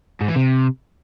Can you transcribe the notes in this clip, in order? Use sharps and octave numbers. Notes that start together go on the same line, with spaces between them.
G#2
E3
C3